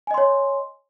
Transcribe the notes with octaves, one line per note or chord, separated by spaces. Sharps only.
C#5 D#5 G#5 C6